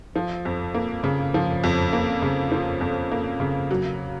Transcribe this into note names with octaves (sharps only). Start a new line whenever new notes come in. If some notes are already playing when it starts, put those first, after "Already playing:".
F3
F2
A#3
C#3
F3
F2
A#3
C#3
F3
F2
A#3
C#3
F#3